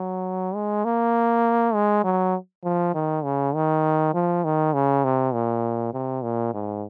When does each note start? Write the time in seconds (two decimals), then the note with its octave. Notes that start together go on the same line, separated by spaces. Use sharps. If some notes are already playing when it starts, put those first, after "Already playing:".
Already playing: F#3
0.55 G#3
0.85 A#3
1.74 G#3
2.04 F#3
2.64 F3
2.94 D#3
3.24 C#3
3.55 D#3
4.14 F3
4.44 D#3
4.74 C#3
5.04 C3
5.34 A#2
5.94 C3
6.23 A#2
6.54 G#2